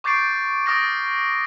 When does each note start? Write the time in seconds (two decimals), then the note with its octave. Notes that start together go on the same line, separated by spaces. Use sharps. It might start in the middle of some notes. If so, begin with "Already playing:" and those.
0.04 C#6 D6 G6 A6 C7 D7
0.66 D6 D#6 F6 A6 A#6 D7